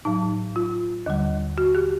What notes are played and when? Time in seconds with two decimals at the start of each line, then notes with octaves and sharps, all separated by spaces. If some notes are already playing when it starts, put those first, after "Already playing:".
0.05 A2 F#3 D#4
0.56 F4
1.06 D#2 D3 G3
1.58 F#4
1.75 G4